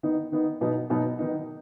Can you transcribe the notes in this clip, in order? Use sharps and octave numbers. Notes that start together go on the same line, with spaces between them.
D#3 B3 D#4
D#3 B3 D#4
B2 F#3 B3 D#4
B2 F#3 B3 D#4
D#3 B3 D#4